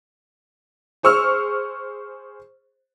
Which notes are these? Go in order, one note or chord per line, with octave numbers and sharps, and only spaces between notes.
G#4 C5 C#6 E6 F6